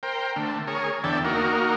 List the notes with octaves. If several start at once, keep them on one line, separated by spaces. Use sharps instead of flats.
A#4 C5 G5
D3 A3
G#4 A#4 C#5
E2 D3 D5 E5 G5 A5
A#3 D#4 F#4 A#4